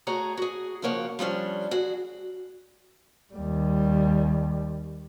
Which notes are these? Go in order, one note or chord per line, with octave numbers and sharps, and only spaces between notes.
A3 F#4 G#4 C#5 A#5
F#4 G#4
C#3 F3 A#3 C#5 F#5
F3 G3 C#4 D4
F#4 G#4
D#2 G3